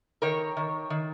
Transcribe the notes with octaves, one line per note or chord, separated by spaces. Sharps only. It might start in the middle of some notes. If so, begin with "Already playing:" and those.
D#3 A#4 C#5
D#3
D#3